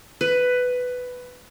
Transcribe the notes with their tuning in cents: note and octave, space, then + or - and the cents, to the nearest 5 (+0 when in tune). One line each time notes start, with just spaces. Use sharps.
B4 +10